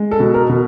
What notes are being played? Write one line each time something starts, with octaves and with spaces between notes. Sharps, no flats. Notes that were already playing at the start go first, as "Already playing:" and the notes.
Already playing: G#3
A4
B2
A#4
B2